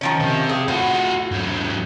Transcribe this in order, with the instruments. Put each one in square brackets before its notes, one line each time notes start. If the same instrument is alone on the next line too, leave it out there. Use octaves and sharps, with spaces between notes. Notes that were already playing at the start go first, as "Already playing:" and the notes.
[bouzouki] D#3 F3 C#4
[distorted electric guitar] C3
[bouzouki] G#4
[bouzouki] A2 [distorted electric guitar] F4 F#4
[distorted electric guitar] G#2 F#3